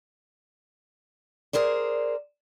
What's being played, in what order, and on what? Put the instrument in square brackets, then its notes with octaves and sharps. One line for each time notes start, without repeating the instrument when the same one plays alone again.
[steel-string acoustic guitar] G#4 A#4 C5 D5